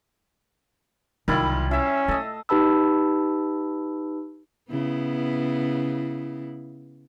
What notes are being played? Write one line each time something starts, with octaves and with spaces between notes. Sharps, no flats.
F#1 C2 D#3 G3 E4 F4
C#4 E4 E5 F5
A3 A4 D#5
D#4 G4 B4 A5 B5 E6
C#3 B3 E4